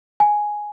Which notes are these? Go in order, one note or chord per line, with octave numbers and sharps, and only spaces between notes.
G#5